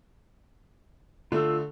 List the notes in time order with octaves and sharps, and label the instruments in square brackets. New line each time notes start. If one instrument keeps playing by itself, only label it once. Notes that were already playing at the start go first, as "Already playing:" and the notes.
[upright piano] D3 A3 [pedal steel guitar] F4 E6